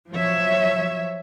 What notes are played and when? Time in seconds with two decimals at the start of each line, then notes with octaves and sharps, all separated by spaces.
0.11 F3 F#3 C#5 E5